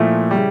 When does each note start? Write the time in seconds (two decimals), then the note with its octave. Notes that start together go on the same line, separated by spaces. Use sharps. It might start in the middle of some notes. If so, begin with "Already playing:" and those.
Already playing: A#2 F3 A3 E4
0.31 C#3 G3